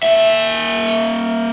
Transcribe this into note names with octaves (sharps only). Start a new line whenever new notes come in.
A#3 E5